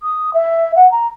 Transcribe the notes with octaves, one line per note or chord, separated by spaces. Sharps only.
D#6
E5
F#5
A#5